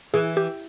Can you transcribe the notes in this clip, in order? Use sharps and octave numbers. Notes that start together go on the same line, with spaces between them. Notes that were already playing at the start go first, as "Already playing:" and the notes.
E3 G#4
G4